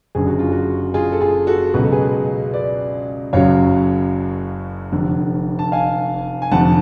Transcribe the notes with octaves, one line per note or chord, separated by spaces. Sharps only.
F#1 F#2 D3 G#4
F#4
F4
F#4
F4 G#4
A4
F4 G#4
F#4 A4
C#2 B2 F#3 B4
A4
G#4 B4
B4 D5
F#1 F#2 C#3 F#3 C#5 F5
F1 F2 D3
A5
F5 G#5
G#5
F1 F2 D3 F3 F#5 A5